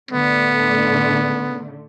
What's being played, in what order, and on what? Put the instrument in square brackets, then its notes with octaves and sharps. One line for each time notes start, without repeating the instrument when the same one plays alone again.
[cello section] A2 D3 A3 [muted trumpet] B3